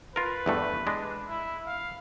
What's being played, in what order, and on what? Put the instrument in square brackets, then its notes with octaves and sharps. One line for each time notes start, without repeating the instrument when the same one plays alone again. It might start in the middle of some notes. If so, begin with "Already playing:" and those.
[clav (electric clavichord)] F4 A#4 [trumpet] B4
[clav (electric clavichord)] E2 G2 A3
G#3 D4
[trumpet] E4
F5